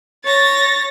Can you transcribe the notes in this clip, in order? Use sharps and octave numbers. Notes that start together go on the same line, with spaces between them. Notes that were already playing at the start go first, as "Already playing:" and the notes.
C#5 A6 A#6